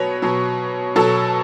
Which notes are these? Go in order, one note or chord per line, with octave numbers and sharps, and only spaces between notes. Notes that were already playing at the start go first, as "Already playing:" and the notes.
Already playing: B2 F#3 B4 C#5
B2 F#3
B2 F#3 A4